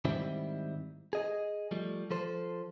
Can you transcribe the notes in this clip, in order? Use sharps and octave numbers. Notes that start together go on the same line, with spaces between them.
G#2 D#3 G3 C4 E4
G#4 D#5
F3 G3 A3
F3 A4 C5